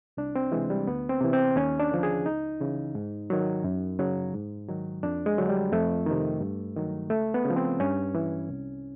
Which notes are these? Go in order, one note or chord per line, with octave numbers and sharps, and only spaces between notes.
C2 D4
C4
C3 E3 G#3
G3
D2 B3
C4
C3 E3
C4
D#2 C#4
D4
D3 F3
G#4
C#2 D#4
C#3 E3
G#2
D#3 F#3
F#2
C#3 F#3
G#2
D#3 F#3
F2 D4
G#3
D3 F#3
G3
F2 A3
C3 D#3
G2
D#3 F#3
C#2 A3
B3
C#3
F3
C4
G2 C#4
E3
C2